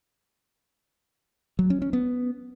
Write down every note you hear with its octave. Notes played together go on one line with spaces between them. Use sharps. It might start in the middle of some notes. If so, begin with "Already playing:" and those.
F#3
C#4
C#4
B3